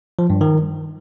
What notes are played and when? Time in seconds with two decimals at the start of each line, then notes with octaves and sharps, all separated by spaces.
0.19 F3
0.30 G2
0.41 D#3